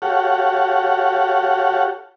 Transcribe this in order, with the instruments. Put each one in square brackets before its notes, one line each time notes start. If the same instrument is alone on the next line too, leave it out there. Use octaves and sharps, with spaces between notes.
[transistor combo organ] F#4 G4 A4 C#5 F5 F#5